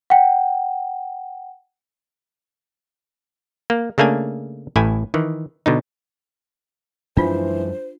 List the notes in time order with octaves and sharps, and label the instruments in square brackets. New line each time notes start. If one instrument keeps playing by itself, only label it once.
[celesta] F#5 G5
[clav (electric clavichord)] A#3
C#3 A3 A#3 D4 G#5
A1 A2 E4 G#5
D#3 E3
B2 D3 D#4
[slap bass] F#2 F3 G#3 [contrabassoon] E3 [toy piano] D4 F4 F5 [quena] C5